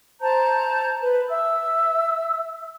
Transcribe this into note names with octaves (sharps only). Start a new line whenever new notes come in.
C5 A5 A#5 G6
B4
E5 E6